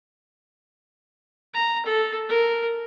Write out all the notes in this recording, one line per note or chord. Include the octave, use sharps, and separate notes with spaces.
A#5
A4
A#4